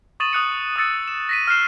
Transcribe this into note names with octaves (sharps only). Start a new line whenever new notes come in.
C#6 D#6 A6 D#7 E7 F#7
D#6 F#6 C#7
D#6 E6 A6 C#7
E7
A#6 B6 D#7
F6 F#6 C7 E7